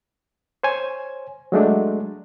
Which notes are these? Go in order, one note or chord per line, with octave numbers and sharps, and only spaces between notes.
C5 C#5 G#5
F#3 G#3 A3 D4